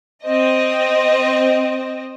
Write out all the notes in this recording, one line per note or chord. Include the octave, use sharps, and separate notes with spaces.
C4 D#5